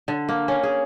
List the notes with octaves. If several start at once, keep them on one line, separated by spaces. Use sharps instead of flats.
D3
A#3
C#4
G#4